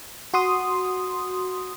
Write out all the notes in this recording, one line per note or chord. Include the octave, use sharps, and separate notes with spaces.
F#4 C6 D#6